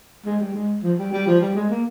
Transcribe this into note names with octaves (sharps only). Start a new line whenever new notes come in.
G#3
G3
G#3
F3
G3
G3
F3
G3
G#3
A#3